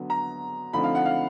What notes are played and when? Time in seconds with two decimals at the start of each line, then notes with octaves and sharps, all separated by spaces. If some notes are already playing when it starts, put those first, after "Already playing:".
Already playing: D3 F#3 B3
0.10 A#5
0.73 D3 F3 A3 C4 D#4 B5
0.84 F5
0.95 F#5
1.06 F5